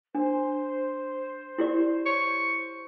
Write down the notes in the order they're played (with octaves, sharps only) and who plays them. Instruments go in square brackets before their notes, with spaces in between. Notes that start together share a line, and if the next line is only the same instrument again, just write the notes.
[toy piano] D4 [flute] C5
[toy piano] E4 G4 D5
[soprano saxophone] C#6